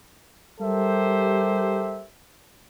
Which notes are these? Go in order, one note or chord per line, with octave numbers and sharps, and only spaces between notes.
G3 G4 A4 A#4 C5 E5